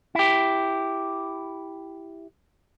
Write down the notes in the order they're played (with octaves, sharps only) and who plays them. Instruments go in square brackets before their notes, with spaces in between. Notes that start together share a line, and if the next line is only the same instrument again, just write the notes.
[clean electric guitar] E4 G4